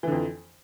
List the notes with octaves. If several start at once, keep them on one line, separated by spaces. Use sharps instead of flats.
F2 D3 E3